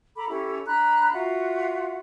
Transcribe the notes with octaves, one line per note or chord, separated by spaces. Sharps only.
A4 A#5 B5 D6
C#4 E4 G4 A4
D4 A#5 B5 F#6
F4 F#4 E5 F#5